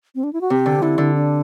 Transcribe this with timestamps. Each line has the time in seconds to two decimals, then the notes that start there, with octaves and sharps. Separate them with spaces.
0.15 C4
0.24 D4
0.33 E4
0.41 F#4
0.50 C3 G4
0.66 D3
0.82 D3 E4
0.98 D3
1.15 D4